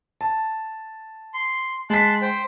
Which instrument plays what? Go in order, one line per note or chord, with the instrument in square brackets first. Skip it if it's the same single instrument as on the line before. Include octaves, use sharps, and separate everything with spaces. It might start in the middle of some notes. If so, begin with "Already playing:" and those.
[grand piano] A5
[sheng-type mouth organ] C6
[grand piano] G#3 B6 [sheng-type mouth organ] A5 C6 F#6
[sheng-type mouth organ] C5 G5